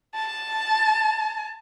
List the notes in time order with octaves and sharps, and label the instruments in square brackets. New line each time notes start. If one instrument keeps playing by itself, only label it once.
[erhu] A5